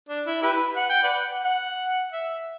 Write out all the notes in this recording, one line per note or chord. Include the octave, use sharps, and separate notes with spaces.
D4
E4
E4 G4 B4
F#5
G5
B4 D5 F#5
F#5
E5